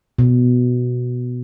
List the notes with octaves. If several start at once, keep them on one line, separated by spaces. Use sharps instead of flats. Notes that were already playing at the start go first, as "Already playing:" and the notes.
B2